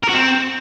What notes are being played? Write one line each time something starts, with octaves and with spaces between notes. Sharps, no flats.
A#4
F#4
C4